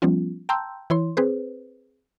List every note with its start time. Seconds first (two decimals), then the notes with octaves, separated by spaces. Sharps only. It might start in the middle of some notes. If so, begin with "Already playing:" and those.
0.02 F3 G3 B3 C#4 F4
0.49 G5 A5 A#5 C6 E6 G6
0.90 E3 E4 C#5 C6
1.17 C4 G#4 B4 C5